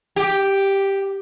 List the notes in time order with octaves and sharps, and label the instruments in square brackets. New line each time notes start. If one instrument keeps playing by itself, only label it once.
[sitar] G4